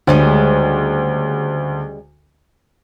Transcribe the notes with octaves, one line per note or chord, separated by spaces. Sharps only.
D2 C#3 G3 G#3